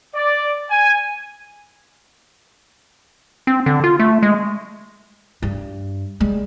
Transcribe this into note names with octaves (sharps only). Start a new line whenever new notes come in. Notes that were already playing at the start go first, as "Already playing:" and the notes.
D5
G#5
C4
D3
F4
A3
G#3
G2
G3 G#3